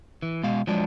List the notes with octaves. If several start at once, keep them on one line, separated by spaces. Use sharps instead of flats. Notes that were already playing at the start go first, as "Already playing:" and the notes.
E3
B2 G#3 F5
F3 F#3 G#3 D4